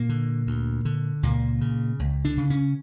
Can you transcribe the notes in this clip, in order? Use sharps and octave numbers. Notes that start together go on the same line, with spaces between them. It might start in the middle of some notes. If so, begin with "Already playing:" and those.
Already playing: A#2 A#3
D3
D2
D3
C#2 A#2 A#3
C#3
C#2
D3 D4
C#3
C#3 C#4